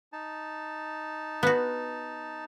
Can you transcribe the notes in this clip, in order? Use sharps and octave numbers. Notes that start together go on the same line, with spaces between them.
D#4 A5
B3 F#4